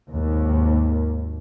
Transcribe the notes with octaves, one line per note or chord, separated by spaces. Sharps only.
G#1 D#2